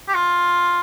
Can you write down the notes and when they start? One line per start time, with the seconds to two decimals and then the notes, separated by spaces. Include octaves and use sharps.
0.08 G4
0.14 F4